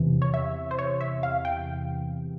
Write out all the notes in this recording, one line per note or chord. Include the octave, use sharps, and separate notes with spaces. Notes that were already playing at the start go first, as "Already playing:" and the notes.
Already playing: E2 C3 E3
C#5
E5
C5
C#5
E5
F5
G5